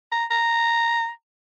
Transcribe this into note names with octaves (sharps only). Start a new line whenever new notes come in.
A#5
A#5